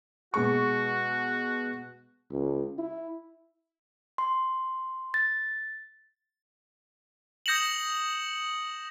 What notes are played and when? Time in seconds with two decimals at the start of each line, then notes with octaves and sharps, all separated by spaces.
0.34 B2 G#3 F#4 C#6
2.32 C#2
2.78 E4
4.18 C6
5.14 A6
7.46 D#6 G6 A#6 C#7 E7 F#7